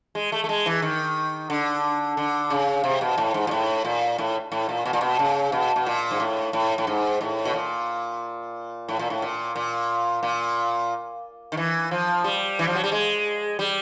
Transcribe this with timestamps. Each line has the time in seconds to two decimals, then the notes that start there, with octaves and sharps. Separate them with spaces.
0.15 G#3
0.32 A3
0.44 A3
0.49 G#3
0.66 E3
0.82 D#3
1.50 D3
2.17 D3
2.50 C#3
2.84 C3
3.01 B2
3.18 A2
3.34 G#2
3.47 A#2
3.51 A2
3.85 A#2
4.18 A2
4.52 A2
4.69 A#2
4.85 B2
4.93 A#2
5.01 B2
5.19 C#3
5.52 B2
5.76 B2
5.87 A#2
6.11 G#2
6.20 A2
6.53 A2
6.78 A2
6.87 G#2
7.21 A2
7.45 B2
7.54 A#2
8.88 A2
8.99 A#2
9.10 A2
9.22 A#2
9.56 A#2
10.23 A#2
11.52 D#3
11.57 E3
11.91 F3
12.24 G3
12.59 E3
12.67 F3
12.75 F#3
12.84 G3
12.92 G#3
13.59 G3